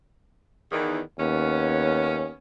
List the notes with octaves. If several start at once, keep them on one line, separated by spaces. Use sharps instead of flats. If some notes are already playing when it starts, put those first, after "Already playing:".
E2 D#3
D#2 B3 C#4